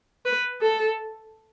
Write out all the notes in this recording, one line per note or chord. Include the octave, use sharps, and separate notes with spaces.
B4
A4